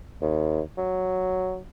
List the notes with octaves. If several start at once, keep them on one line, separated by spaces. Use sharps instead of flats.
D#2
F#3